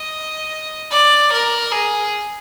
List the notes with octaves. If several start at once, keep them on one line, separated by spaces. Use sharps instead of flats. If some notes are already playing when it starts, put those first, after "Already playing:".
Already playing: D#5
D5
A#4
G#4